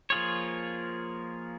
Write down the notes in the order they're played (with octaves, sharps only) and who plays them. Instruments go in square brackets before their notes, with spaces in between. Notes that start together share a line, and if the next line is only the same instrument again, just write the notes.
[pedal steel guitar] F3 A#3 F4 G#4 C#5